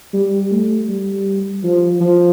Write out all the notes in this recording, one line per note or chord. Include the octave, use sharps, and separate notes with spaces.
G3
A3
G3
F3
F3